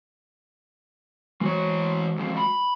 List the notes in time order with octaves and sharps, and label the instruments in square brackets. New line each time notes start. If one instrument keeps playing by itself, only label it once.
[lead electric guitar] E3 C#5 [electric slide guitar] G#3 F#4 C5
[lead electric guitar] E2 F3
B5